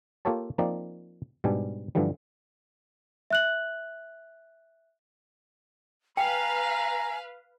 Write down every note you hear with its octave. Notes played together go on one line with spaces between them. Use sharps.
A#3 F4 G4 A4 C#5 A5
F3 A#3 C4 D#4 D5
G#2 B2 G3 D4 G#5
G2 D3 E3 F3 G3
E5 F#6 F#7
B4 F5 G5 G#5 A#5